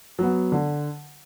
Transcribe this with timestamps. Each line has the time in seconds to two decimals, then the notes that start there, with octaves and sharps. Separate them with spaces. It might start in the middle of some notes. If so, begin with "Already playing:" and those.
0.19 F#3 B3
0.52 D3